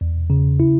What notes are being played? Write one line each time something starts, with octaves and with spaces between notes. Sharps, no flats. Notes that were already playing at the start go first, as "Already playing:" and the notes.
E2
C#3
E4